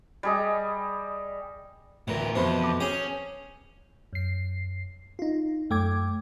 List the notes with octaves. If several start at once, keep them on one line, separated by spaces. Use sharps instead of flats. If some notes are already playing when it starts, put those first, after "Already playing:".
G3 G#4 D#5
D2 A2 E3 A#4
F2 B2 E3 C5 B5 C6
D6
C#4 G#4 G5
F#2 C7
D#4 F4
F#2 A3 G5 D6 G#6